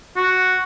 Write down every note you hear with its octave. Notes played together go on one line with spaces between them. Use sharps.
F#4